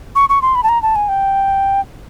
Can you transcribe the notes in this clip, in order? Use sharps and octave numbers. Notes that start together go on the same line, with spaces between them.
C#6
C#6
C6
B5
A5
A#5
A5
G#5
G5